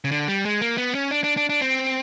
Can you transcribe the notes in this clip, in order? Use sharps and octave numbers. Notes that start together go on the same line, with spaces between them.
C#3
D3
G3
G#3
A#3
B3
C#4
D4
D4
D4
D4
C4